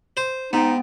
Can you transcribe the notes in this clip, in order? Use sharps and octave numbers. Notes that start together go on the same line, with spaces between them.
C5
G#2 B3 D#4 G5